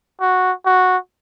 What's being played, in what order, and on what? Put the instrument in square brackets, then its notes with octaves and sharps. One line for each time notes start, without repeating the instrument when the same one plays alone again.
[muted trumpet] F#4
F#4